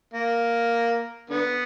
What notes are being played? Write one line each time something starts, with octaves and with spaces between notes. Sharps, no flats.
A#3
D3 B3